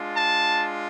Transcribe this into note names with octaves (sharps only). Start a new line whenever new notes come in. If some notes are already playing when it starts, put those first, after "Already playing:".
Already playing: G#3 D4 F4
A5